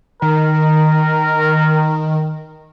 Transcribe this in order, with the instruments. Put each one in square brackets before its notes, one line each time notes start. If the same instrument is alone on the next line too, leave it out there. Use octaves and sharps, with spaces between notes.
[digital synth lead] D#3 [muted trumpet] A#4